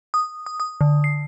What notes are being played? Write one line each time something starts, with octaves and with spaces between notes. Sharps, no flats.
D#6
D#6
D#6
D3
C7